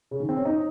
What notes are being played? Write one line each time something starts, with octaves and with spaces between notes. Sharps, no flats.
C#3
D#3
C4
C#4
D#4